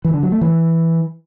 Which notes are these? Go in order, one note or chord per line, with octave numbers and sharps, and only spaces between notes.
E3
D3
F#3
A3
E3